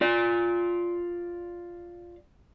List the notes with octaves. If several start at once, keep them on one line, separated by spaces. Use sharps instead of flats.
F4 D5